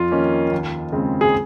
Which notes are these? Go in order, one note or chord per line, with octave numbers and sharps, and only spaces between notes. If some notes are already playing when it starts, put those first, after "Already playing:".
Already playing: F2 F4
D#3 A#3 C#4
D#2
C#3 G#3 C4
G#4